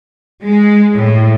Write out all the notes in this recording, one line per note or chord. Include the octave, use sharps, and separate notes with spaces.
G#3
A2